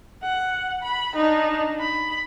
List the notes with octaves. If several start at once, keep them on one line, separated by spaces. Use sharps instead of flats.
F#5
B5
D4 D#4
B5